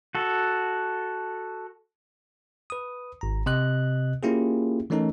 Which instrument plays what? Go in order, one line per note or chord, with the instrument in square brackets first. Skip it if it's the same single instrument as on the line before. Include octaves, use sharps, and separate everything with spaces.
[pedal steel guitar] F#4 A4
[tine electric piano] B4 D#6
G#1 A#5
C3 D#5 F#6
A#3 C#4 E4 F4 G4 G#4
E3 A3 C#4 D#4 A4 A#4